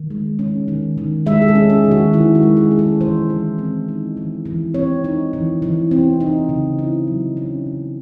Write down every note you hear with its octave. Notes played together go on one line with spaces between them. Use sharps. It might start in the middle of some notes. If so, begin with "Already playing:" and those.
Already playing: D#3
G#3
C#4
D#3
D#3
G#3 E5
G#4
A4
C#4
G#4
D#3
F#4
D#3 E4
F#4
G#3
G#4
C#4
A4
E3 C5
E3
C4
D#4
E3
E3
C4 C#5
D#4
E3
E3
C4
D#4
C#3
E4
F#3
C#4
C#3